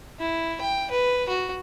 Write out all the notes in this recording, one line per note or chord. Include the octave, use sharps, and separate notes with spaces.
E4
G5
B4
F#4